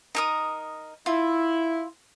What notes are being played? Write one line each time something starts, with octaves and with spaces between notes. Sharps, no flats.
D#4 A#4 D#6
E4 F4